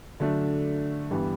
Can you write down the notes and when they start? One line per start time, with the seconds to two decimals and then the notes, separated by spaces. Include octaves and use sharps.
0.20 D3 F#3 A3 D4
1.11 G2 E3 G3 B3